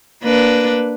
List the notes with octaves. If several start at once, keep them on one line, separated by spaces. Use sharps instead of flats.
A#3 D4 B4